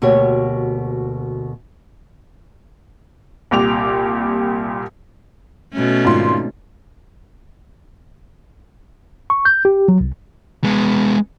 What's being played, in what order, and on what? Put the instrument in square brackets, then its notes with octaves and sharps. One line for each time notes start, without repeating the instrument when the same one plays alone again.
[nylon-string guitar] D2 B2 A#3 G4 C#5
[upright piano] C2 A#2 G4 D6 F7
[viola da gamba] B2 A3 C#4
[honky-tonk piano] G#1 F4 C6
[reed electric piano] C#6
G6
G4
F#3
C2
[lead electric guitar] G#3 B3